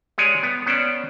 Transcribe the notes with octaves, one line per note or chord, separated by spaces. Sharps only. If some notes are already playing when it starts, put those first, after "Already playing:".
G#3 G4 G#4 C#5 D5 G#5
B3
B3 C#4 C5 D5